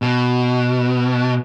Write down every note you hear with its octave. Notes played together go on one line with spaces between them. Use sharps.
B2